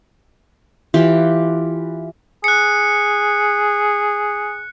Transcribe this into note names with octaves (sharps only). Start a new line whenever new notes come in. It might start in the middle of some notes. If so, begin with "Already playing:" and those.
E3 F4 G4
G#4 F#6 C#7